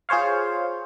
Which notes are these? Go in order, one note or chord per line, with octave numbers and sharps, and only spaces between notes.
F4 G#4 C5 C#5 F5